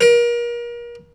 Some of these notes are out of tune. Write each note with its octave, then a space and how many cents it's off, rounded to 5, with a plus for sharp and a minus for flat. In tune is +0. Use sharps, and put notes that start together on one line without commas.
A#4 +35